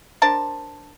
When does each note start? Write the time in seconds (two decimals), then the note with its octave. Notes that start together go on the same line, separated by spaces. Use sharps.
0.22 D4 A#4 C5 A5